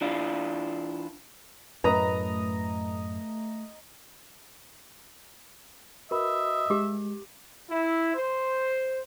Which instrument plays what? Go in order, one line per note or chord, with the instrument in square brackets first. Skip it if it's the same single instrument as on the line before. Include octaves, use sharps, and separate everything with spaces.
[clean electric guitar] E3 D4 E4 F4
[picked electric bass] F#2 A2 [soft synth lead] A3 [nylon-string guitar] B4 [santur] D#5 A#5
[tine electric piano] F#4 B4 B5 [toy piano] A#4 [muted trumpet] D#5 [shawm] E5
[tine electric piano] G#3 [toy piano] G4 D6
[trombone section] E4
C5